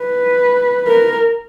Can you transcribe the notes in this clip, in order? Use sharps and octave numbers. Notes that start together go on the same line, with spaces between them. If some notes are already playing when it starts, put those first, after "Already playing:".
Already playing: B4
A#4